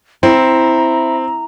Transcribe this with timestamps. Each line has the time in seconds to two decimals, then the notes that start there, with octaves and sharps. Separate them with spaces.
0.23 C4 E4 A#5